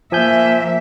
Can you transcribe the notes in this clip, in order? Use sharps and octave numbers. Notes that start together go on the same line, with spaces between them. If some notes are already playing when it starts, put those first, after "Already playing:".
F3 A#3 E5 G#5 G6